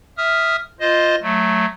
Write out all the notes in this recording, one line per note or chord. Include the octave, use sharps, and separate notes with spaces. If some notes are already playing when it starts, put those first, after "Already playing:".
E5 D#6 F6
F4 C5 D#5
F#3 A3